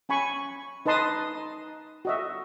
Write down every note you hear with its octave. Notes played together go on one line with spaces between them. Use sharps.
C#4 G#5 B5 C#6
D#4 B4 D#5 A5 C6 D#6
F#4 D#5 E5